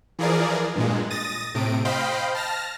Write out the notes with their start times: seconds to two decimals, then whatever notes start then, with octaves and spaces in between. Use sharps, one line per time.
0.19 E3 F3 G#4 A#4 D5
0.76 G2 A#2 G#3
1.10 D#6 A6 A#6 D#7
1.54 A2 C3 D7
1.85 C5 D#5 F5 G5 B5
2.34 A5 F6 A#6